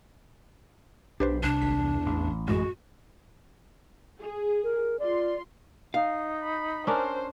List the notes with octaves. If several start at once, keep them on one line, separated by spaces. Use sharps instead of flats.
B1 D4 G4 B4 C5
C2 D4
G#1 B6
E2
A1
F#2 A2 G#3 F#4
G#4
A#4
F4 D5 C6
D#4 F5
B5
C#4 D4 A#4 C5